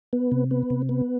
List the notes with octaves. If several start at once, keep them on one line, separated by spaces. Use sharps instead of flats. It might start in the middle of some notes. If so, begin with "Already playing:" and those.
B3
C3
B3
C3
B3